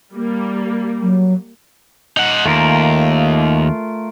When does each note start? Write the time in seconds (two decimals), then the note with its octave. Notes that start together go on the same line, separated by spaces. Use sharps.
0.14 G3 A#3
1.02 F#3
2.17 D#4 F#5
2.46 D#2 A3 F4 A#4